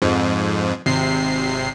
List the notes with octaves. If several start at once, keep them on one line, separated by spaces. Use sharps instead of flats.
F2 G#2
G#1 C3 C7